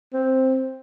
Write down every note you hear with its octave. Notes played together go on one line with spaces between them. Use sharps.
C4